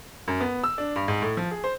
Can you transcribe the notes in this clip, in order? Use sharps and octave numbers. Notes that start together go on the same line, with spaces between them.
F#2
B3
E6
D4
G2
G#2
A2
F3
G#4
C5